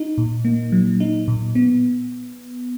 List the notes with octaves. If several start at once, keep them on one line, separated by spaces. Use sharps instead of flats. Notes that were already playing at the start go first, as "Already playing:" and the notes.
Already playing: D#4
A#2
A#3
F#3
D#4
A#2
B3